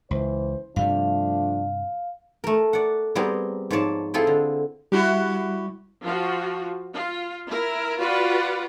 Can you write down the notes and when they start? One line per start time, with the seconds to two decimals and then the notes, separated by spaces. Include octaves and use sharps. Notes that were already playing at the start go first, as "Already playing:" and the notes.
0.11 C#2 E3 C5
0.76 G2 C3 F3 G3 A3 D4 F5
2.44 A3 A#4
2.73 D5 F#5
3.15 G3 B3 C4 G#4 A#4
3.70 G#2 F3 C#5 D5 A5
4.14 C4 E4 F4 G#4 A4
4.27 D3
4.92 G3 E4 F#4 G4
6.03 F3 F4 F#4
6.94 F4
7.49 E4 A#4
7.99 F4 F#4 B4 D5 F#5